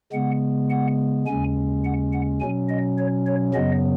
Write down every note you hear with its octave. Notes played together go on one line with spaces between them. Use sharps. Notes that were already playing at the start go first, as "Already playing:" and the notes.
C#3 G#3 B3 F#5
F#5
D#2 C#3 G#3 C#4 G#5
F#5
F#5
B2 F#3 C#4 G#5
D#5
C#5
C#5
F#2 C#3 F#3 B3 D#5